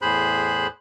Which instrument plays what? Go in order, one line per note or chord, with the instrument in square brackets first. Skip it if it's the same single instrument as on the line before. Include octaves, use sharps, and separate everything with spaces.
[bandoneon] E2 A2 G#4 C5 B5 F#6